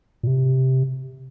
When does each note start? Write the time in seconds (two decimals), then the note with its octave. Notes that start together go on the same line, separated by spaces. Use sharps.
0.23 A#2
0.27 C3